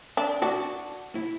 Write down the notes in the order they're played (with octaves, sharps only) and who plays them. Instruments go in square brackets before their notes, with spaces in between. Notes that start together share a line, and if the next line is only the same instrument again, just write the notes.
[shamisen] D4
[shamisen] D4 [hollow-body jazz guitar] F#4
[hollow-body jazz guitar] E4